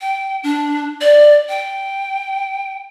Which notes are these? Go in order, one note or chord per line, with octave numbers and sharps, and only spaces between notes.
G5
D4
D5
G5